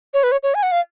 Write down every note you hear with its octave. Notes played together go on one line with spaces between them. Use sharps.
C#5
B4
C#5
C#5
G#5
F#5
F5